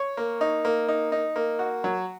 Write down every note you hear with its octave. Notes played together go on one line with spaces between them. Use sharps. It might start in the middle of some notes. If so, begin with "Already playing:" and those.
Already playing: C#5
A#3
D#4
A#3
D#4
D#4
A#3
F#4
F#3